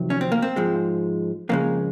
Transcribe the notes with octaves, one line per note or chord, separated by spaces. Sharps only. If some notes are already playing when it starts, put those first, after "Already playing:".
Already playing: F2 C3 D#3 F#3
C#4
C4
A#3
C4
G#2 F3 G#3
F2 C#3 G#3 A#3